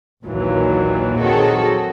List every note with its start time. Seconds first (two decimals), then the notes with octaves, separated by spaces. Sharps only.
0.22 A#1 D#2 A#2 E3 F#3
1.18 D#3 F#3 C4 F#4 G#4 A4